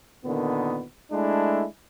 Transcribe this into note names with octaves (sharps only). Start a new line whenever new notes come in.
A#2 D3 D#3 B3
G#3 A3 D4 E4